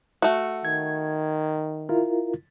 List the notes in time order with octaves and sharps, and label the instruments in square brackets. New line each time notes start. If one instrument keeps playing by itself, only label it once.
[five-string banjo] A3 F#4
[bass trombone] D#3 [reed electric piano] G#6
[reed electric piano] E4 F4 A#4